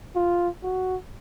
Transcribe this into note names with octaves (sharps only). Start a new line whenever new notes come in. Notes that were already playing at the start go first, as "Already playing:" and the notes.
F4
F#4